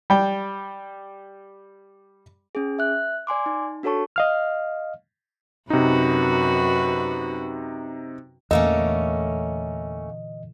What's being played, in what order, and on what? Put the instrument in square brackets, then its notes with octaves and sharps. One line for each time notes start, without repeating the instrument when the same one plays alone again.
[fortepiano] G3 G5
[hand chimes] C#4 G#4
E5 F#6
D5 G#5 C6 D6
D#4
D4 F#4 A4 C#5 A5 C#6
[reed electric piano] D#5 F5 F6
[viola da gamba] F#2 F#4 B4 [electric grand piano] C3 D#4
[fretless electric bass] E2 [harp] A#2 D3 E3 [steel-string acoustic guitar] A3 A#3 C#4 [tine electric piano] D#5